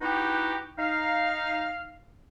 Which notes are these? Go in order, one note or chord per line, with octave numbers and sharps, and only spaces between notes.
B3 D#4 E4 F#4 G4
D#4 F5